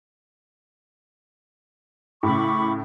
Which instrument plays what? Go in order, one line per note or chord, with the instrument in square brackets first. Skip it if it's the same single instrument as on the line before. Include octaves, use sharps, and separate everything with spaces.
[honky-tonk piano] A2 C#3 [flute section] B5 C#6 D6